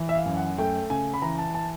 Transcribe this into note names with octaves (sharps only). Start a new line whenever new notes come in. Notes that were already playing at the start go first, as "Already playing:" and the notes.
Already playing: E3
E5
F5
F#2
F#5
A3 G5
C#3 G#5
B5
E3 A#5
A5
A5